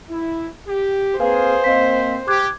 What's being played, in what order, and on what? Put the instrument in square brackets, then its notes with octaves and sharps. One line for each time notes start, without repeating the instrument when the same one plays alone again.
[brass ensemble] E4
G4
[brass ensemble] A#3 C4 G#4 [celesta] B4 F5 G#5 [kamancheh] C5
[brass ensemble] A#3 C4 [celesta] D#5 F5 B6
[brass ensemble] G4 [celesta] D6 F#6 G#6